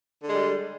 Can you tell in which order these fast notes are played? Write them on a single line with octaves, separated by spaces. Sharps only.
D3 G#3 G3